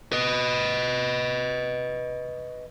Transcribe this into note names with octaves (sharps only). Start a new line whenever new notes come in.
B4 D#5